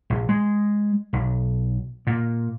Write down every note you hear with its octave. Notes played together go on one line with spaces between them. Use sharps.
A#1
G#3
B1
A#2